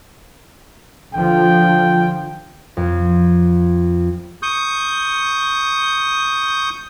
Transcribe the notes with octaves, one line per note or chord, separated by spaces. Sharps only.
D3 F3 G5
F2
C#6 D#6 G6